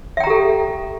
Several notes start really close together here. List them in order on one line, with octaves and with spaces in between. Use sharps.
E5 G5 A#5 G4 A4